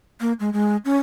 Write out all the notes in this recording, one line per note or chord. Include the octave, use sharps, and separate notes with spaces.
A#3
G#3
G#3
C#4